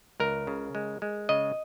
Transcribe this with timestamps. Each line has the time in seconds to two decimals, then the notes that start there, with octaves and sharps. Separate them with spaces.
0.20 C#2 A#4
0.47 C#3
0.75 G#3
1.02 G#3
1.29 C#3 D#5